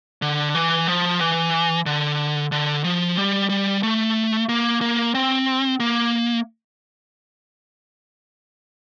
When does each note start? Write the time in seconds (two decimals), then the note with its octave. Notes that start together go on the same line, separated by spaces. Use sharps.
0.22 D3
0.55 E3
0.87 F3
1.20 E3
1.86 D3
2.52 D3
2.84 F3
3.17 G3
3.49 G3
3.83 A3
4.49 A#3
4.81 A#3
5.15 C4
5.80 A#3